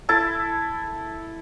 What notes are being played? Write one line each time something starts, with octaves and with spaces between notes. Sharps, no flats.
E4 A4 A5